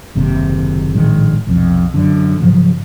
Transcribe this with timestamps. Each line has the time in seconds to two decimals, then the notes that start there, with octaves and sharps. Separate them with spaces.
0.15 F#1 D#2 C3
0.94 A#1 A2 D#3 G#3
1.47 B1 F2 C3
1.94 F#2 D3
2.40 G#2 C#3 F3 F#3